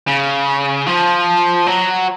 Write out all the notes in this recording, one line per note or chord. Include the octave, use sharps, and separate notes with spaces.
C#3
F3
F#3